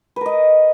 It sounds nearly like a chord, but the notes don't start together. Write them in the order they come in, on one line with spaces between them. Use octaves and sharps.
B4 A#4 D#5